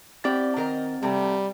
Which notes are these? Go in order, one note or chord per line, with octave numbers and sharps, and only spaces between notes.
C4 E4 G4 D5 A6
D#3 A#4 D#5
C3 G3 A3